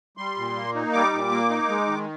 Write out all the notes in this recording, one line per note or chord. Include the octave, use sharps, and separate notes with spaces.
G3 C6
A#2
A#3
D#4
G3 D6
A#2
A#3
D#4
G#3
D#3